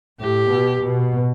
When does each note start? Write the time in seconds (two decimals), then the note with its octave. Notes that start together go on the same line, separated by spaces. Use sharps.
0.20 A2 G4
0.50 B2
0.81 B2